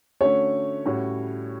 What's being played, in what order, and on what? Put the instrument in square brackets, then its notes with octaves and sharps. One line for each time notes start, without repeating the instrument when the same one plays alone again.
[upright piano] D3 A3 C#4 F#4 [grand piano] C#5
[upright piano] A2 G3 C#4 F#4